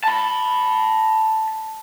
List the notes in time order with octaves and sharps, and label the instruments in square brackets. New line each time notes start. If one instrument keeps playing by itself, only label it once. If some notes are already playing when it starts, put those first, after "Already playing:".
[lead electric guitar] A5 B5